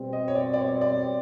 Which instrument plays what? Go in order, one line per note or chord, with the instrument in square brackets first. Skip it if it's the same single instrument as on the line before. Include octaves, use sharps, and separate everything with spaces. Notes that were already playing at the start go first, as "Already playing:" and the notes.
Already playing: [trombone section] B2 G3 C4
[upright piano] D#5
C#5
D5
D5
C#5
D5